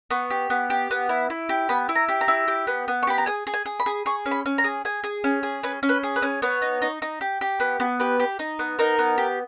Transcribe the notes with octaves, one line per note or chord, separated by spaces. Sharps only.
B3 C#6
G4
B3
G4
B3
E4
E4
G4
B3 B5
E4
A#5
G4
A#5
E4
G4
B3
B3
C#6
G4 B5
A#5
G#4 G#5
G#4
G#5
G#4
B5
G#4
G#4 C#6
C#4
B5
C#4
A#5
G#4
G#4 G#5
G#4
C#4
G#4
C#4 B4
C#4
B4
G#4
B4
C#4
B3 C#5
D#4
D#4
D#4
G4
G4
B3
B3
G4 B4
G4
D#4
B3
D#4 A#4
B3
G4